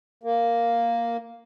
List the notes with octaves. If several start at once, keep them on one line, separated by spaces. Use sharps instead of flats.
A#3